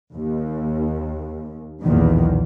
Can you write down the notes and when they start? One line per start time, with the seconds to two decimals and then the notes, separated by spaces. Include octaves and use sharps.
0.13 D#2
1.82 B1 E2 A#2 D#3